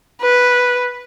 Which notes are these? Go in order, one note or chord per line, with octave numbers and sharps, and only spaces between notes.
B4